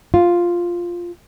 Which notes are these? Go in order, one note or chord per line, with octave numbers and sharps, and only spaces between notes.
F4